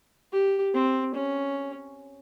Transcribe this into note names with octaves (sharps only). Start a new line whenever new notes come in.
G4
C4
C#4